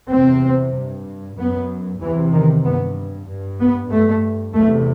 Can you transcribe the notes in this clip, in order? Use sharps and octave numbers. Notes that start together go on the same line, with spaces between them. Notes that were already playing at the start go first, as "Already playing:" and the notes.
E2 C3 C4
G2
F#2 B3
E2 C3 E3
D#3
G2 B3
G2
B3
G2 A3
E2 C3 A3